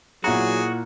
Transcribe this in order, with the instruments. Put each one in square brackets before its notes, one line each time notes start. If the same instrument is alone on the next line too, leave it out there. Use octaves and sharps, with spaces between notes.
[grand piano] A#2 E4 A#5 [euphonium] F#3 [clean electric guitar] F#4 [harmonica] G#4